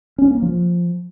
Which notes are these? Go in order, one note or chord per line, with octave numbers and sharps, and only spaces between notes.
C#4
A#3
F3